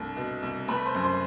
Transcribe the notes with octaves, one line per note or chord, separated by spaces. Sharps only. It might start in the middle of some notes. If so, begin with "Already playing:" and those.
Already playing: C2 G2 A3
B2
C2
A3 B4 B5
C5 C6
F#2
C5 C6